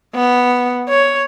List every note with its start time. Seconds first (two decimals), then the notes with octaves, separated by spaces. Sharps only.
0.15 B3
0.89 C#5